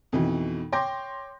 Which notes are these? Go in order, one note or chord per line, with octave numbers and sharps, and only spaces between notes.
F2 B2 D#3 E3
C#5 G5 C6 D6 G6 A#6